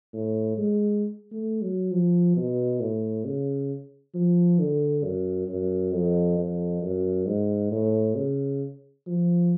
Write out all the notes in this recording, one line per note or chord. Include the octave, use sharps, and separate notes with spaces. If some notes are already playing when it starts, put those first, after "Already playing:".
A2
G#3
A3
F#3
F3
B2
A2
C#3
F3
D3
F#2
F#2
F2
F2
F#2
G#2
A2
C#3
F3